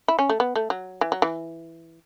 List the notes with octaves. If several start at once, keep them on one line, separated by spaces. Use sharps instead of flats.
E4
C#4
A3
B3
A3
F#3
E3
F#3
E3